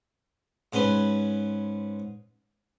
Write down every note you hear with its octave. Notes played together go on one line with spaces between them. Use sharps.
G#2 C#4 B4 C6